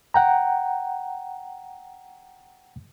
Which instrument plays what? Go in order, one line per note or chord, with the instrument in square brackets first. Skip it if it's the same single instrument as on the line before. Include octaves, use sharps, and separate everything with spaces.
[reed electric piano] F#5 G5 A#5